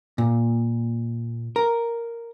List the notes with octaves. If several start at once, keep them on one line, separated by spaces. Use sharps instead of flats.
A#2
A#4